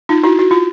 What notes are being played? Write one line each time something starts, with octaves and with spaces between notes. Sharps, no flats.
D#4 F4
E4 F#4
F#4
F4